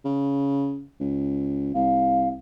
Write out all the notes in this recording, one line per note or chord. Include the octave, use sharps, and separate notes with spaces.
C#3
C#2
C2 F5